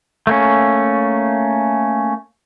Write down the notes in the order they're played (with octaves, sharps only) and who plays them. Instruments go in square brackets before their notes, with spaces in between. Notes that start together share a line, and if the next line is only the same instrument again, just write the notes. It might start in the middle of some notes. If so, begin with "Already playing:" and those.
[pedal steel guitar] A3 A#3 C#4